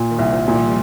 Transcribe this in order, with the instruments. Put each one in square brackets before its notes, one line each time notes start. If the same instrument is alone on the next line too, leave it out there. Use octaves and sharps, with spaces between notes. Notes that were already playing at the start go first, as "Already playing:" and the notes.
Already playing: [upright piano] A#2
[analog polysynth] D#3
[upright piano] C2
[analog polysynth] F3
[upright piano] A#2
[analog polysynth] G3